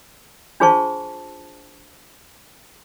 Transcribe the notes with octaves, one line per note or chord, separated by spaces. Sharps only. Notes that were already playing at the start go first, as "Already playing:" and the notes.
D4 F4 G#4 C5 A5 C#6